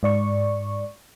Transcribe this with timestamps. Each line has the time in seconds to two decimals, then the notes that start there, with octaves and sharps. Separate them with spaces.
0.03 G#2 D5 C#6